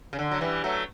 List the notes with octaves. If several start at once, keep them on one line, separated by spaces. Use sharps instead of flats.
C#3
D3
F#3
E3 G3
F#3 A3